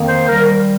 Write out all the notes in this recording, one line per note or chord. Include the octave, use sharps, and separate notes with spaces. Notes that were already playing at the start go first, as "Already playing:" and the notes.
Already playing: F2 D#3 A#3
C5
D#3 G3 A#4